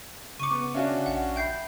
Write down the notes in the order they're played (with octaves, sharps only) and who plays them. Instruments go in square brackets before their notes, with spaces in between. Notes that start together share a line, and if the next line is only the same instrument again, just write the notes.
[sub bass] C#3 [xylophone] C#6 D6 [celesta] C#7 D#7
[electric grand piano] B3
[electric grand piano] C#4 D4 F#4 [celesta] E5 F5 G#5
[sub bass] A#1 [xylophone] F#5
[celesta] E5 B5 [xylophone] G5 G6 C7